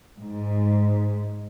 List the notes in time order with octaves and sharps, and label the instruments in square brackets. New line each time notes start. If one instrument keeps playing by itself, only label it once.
[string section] G#2